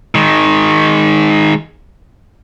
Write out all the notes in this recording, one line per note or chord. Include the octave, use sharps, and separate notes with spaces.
D#3 G#3